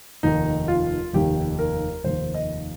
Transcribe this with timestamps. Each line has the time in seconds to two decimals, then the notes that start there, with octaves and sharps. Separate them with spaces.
0.23 F1 D#2 D#3 D#4
0.68 F4
1.13 F1 D#2 D#3 G4
1.59 A#4
2.04 F1 D#2 D#3 C5
2.34 D#5